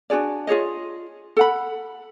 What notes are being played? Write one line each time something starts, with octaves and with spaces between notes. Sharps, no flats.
D4 F#4 G#4 D5
F4 G#4 C#5 D#5
A4 F#5 B5